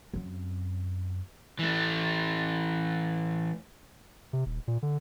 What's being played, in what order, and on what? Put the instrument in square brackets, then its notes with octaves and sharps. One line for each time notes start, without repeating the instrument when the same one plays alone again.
[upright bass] F#2 C4
[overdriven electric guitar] E3 A3
[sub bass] C3
D#1
A#2
D3